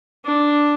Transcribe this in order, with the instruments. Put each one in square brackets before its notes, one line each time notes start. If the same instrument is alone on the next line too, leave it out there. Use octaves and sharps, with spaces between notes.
[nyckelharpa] D4